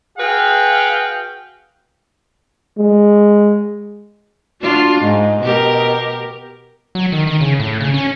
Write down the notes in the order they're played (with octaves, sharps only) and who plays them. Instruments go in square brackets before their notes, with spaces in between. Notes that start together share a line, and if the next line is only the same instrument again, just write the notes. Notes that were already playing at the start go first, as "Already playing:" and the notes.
[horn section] F#4 G#4 B4 F5 G5
[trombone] G#3
[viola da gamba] D4 F4 [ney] F#4
[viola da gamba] G#2 [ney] D#5
[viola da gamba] B2 G4 A#4
[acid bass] F#3
D#3
D#3
C#3
A2
C#3
C#4